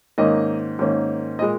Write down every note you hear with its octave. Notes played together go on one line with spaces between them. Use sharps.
G#2 D#3 A#3 C#4 D#5
G#2 D#3 A#3 C#4
A#2 G#3 D#5